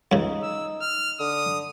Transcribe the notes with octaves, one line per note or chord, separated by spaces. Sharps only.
C#2 C#3 D#4
E6
F6
D3 D#6